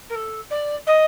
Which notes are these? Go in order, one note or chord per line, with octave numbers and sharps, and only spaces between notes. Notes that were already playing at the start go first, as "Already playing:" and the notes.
A#4
A4
D5
D#5